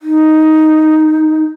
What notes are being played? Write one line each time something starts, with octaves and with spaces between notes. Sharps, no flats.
D#4